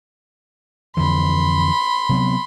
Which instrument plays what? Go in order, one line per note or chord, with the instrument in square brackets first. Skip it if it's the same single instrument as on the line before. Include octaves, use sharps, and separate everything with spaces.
[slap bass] F2 D3 E3 [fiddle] B5 C6
[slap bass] C3 F#3 B3